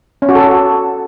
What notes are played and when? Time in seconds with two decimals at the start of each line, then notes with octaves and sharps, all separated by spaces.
0.22 C#4
0.29 F#4
0.35 A4